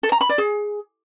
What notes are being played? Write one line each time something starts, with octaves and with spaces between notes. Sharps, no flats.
A4
A#5
B5
D5
G#4